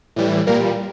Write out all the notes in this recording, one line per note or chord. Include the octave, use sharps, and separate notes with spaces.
A2 E3 G3
A#2 G3 A#3 A#4